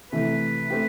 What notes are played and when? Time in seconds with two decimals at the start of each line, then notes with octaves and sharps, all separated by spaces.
0.11 C3 E3 A3 B4
0.70 A3 C4 G4